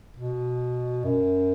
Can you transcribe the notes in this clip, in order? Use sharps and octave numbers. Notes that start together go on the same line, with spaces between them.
B2
F#2